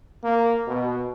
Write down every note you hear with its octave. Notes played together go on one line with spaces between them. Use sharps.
A#3
B2